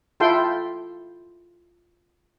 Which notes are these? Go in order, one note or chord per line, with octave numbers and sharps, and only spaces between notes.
E4 F4 A4 G5 C6